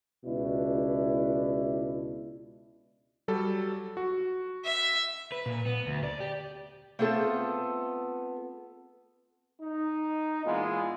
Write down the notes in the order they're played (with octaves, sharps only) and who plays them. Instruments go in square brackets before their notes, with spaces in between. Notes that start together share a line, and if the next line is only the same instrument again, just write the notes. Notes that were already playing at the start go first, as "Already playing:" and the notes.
[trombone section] C#2 B2 D4 E4
[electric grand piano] F#3 G3 A4
F#4
[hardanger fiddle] E5
[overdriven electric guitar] B4
A#2
B3
D2
D5
G4
[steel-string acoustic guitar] A3 B3 C4 F4 A4
[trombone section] D#4
A#2 E3 G#3 B3 F4